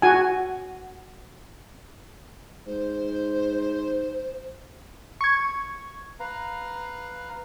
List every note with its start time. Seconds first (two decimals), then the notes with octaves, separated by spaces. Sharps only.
0.02 F#4 G#5
2.66 G#2 C5
5.21 C#6 G#6
6.20 B4 F5 A#5